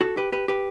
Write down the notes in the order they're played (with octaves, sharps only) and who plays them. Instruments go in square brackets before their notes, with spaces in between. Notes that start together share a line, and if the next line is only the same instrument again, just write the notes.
[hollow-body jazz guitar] F#4 A4
G4 B4
G4 B4
G4 B4